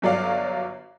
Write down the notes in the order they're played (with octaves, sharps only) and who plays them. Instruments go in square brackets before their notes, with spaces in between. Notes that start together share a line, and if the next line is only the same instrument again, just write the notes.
[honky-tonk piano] G1 F#3 D5 F5